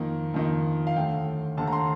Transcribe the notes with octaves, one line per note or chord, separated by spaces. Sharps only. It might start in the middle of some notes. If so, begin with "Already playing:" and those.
Already playing: F2 D#3 A#3
F2 D#3 A#3
F5
D#2 D3 A3 G5
D#2 D3 A3 A5
A#5
C6